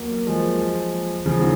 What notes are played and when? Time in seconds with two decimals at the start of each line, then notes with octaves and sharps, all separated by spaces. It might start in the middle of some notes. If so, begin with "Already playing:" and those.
Already playing: F#3 A#3
0.27 F3 G#3
1.26 C#3 F3
1.40 D#3 F#3